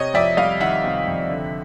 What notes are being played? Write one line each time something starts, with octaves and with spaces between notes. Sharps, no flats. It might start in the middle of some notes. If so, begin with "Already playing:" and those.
Already playing: C3 C#5 D#5
F2 D5 E5
G3 D#5 F5
D#3 E5 F#5
C3
F2
D3